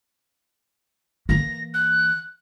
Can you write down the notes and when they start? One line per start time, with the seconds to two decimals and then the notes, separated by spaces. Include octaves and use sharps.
1.29 E3 A#3 A#6
1.74 F#6